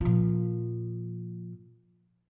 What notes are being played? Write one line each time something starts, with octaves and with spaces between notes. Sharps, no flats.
A#2 F3